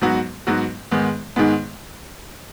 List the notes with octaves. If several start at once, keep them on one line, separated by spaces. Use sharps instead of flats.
G#2 F#3 B3 F#4
G#2 F#3 B3 F#4
G#2 D#3 G#3 B3
G#2 D#3 G#3 B3